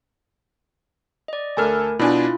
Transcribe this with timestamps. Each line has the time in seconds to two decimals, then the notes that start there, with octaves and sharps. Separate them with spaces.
1.28 D5 D#5
1.57 D2 A3 A4 A#4 G#5 F6
1.99 B2 D4 E4 F4 G#5